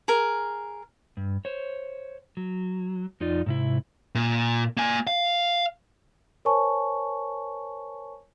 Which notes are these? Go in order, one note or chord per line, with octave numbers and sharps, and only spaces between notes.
G#4 A#4
G2
C5 C#5
F#3
F2 D#4 F4 D5
G#2 C3 E4
A#2
A#3 G#5
F5
A#4 C5 C#5 G#5 A5 C#6